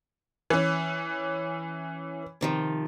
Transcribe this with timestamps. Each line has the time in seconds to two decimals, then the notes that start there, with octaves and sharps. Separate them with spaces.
0.50 E3 C#4
2.41 C3 D#3 F3